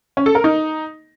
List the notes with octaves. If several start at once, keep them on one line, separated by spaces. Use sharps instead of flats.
C#4
A4
A#4
D#4